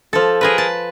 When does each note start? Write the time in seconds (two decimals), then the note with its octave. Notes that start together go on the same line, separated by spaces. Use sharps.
0.13 F3 A4
0.41 G#4 A#4 B4
0.58 A5